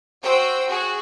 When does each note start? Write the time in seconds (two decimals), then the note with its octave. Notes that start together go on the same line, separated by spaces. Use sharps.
0.23 F#4 C5 G5 E6
0.67 F#4 G#4